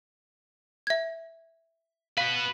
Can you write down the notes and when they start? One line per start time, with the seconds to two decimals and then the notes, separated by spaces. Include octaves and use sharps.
0.87 E5 G#6
2.17 F#4 B4 F5